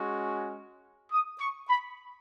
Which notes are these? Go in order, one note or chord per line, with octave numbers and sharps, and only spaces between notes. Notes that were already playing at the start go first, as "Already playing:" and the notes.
Already playing: G#3 C#4 F#4
D#6
C#6
B5